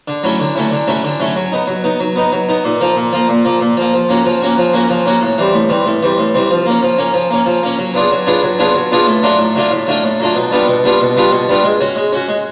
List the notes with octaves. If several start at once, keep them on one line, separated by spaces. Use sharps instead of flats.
D3
F#3 A3 C#4 E4
D3
F#3 A3 C#4 E4
D3
F#3 A3 C#4 E4
D3
F#3 A3 C#4 E4
F#3
B3 D#4
F#3
B3 D#4
F#3
B3 D#4
F#3
B3 D#4
A#2
F3 A#3
A#2
F3 A#3
A#2
F3 A#3
A#2
F3 A#3
F3
A#3 C#4 F#4
F3
A#3 C#4 F#4
F3
A#3 C#4 F#4
F3
A#3 C#4 F#4
A2
E3 G3 C4
A2
E3 G3 C4
A2
E3 G3 C4
A2
E3 G3 C4
F3
A#3 C#4
F3
A#3 C#4
F3
A#3 C#4
F3
A#3 C#4
F#3
B3 D4 F4 G#4
F#3
B3 D4 F4 G#4
F#3
B3 D4 F4 G#4
F#3
B3 D4 F4 G#4
A2
F#3 A3 D4 F4
A2
F#3 A3 D4 F4
A2
F#3 A3 D4 F4
A2
F#3 A3 D4 F4
B2
G3 B3 D4 F4
B2
G3 B3 D4 F4
B2
G3 B3 D4 F4
B2
G3 B3 D4 F4
G#3
C#4 F#4
G#3
C#4 F#4
G#3